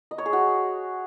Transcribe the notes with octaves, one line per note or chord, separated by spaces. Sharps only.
D#5
C#5
G#4
F#4